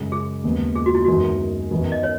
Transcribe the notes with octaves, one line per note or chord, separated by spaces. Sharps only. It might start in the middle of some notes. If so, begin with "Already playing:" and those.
Already playing: F#2 C#3 G#3
G#4
D#2 C#3 G#3 B3
G#4
F#4
E4
F#2 D#3 G#3 B3 F#4
F#2 D#3 F#3 B3
D#5
C#5